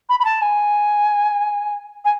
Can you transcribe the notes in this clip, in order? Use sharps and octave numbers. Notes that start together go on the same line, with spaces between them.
B5
B5
A5
G#5
G#5